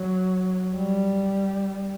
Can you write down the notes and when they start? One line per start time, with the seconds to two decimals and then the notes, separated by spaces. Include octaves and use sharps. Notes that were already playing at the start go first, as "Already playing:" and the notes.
Already playing: F#3
0.75 G3